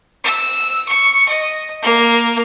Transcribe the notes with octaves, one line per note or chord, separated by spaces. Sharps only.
E6
C#6
D#5
A#3